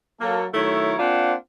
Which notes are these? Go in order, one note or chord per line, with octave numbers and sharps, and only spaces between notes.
F#3 A#3 A4
D#3 F#3 A3 E4 C#5 A#5
A#3 C4 D4 F4 C5 F#5